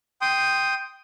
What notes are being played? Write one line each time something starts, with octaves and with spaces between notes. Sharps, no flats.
G5 C6 D#6